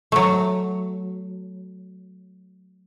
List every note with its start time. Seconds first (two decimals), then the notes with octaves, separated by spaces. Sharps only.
0.12 F#3 A3